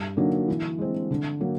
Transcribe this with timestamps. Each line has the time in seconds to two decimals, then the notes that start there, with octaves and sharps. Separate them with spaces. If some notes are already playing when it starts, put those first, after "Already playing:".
Already playing: G2
0.17 D3 F#3 A#3 D#4
0.48 E3
0.78 G#3 C4
1.11 D3
1.41 F#3 A#3